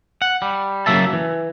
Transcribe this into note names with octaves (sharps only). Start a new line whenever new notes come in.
F#5
G3
C#3 F#3 A#3 E5 A5
E3